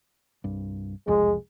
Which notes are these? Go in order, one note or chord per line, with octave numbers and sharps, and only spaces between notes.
C2 G2
E1 C2 F2 G#3